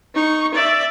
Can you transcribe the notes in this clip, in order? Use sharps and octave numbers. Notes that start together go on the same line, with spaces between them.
D#4 C#6
D5 E5